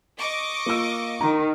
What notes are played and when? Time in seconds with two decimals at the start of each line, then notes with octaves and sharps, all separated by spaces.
0.18 D#5 C#6 D6
0.66 A#3 F4 E6
1.21 D#3 A#5